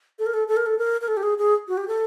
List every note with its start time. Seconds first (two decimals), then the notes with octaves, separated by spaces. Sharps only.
0.19 A4
0.26 A#4
0.34 A4
0.48 A4
0.57 A#4
0.66 A4
0.78 A#4
1.01 A#4
1.08 A4
1.17 G4
1.23 G#4
1.38 G#4
1.68 F#4
1.77 G4
1.88 A4